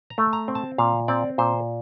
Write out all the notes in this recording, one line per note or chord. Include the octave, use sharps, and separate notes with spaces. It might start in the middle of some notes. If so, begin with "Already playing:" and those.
A#5
A3
A#5
C4
A5
A#2 F5
C4 D5
A#2 C5